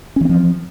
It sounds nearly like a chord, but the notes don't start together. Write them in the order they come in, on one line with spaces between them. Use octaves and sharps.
C#4 E3 C4 F3